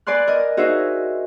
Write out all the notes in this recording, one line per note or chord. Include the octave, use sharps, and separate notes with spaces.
B4 D5 G#5 C6 F#6
A#4 D#5 D#6
D#4 F#4 G#4 C5 D#5 E5